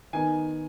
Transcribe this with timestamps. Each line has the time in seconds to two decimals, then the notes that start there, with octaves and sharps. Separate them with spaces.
0.13 D#3 B3 D#4 G#5